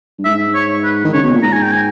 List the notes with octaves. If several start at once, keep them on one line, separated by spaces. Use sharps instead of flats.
G2
G#2 E5
C#5
B4
D#3
C#3 C#5
B2
A#2
G#2 A#5
G#5
G5
G#5